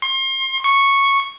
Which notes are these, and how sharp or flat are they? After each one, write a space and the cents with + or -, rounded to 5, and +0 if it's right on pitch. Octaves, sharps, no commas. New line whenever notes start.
C6 +35
C#6 -5